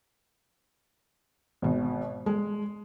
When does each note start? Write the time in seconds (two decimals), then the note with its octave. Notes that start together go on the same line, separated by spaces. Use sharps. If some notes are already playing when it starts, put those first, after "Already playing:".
1.62 G#1 B2
2.26 G#3